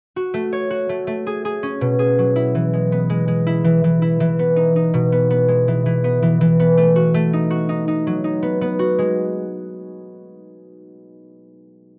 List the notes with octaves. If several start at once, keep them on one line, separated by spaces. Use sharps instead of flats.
F#4
A3
C#5
F#4
A3
A3
G#4
G#4
C#4
B2
G#4
F#3
E4
E3
G#3
B3
G#3
G#3
E4
E3
E3
E4
E3
B3
D#4
D#4
B2
B3
B3
G#3
E3
E3
B3
E3
E3
B3
A3
F#4
A3
D#4
F#4
D#4
D#4
F#3
D#4
B3
B3
F#4
G#3